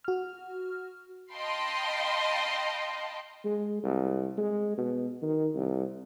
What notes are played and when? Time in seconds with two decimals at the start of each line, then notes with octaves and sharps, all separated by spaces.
0.04 F#4 F6
1.32 D#5 F5 G5 A5 B5 C6
3.44 G#3
3.83 C2
4.37 G#3
4.78 B2
5.22 D#3
5.54 C2